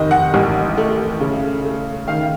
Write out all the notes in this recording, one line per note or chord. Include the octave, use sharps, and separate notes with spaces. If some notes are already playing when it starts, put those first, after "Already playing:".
Already playing: F1 D#3 D#5
F#5
A1
A3
C#3
A3
D#3 F5